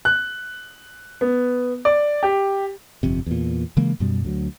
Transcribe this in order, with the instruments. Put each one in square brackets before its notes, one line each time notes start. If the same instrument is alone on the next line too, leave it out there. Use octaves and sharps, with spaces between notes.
[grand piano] F#6
B3
D5
G4
[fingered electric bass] G1 F2 C3
E2 A#2
C#3 E3 G#3 A#3
F#2 B2 G3
D2 F#3